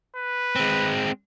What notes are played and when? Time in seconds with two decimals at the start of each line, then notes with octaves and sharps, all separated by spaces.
0.16 B4
0.56 G#3 C4